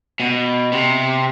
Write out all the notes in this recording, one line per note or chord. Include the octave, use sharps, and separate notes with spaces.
B2
C3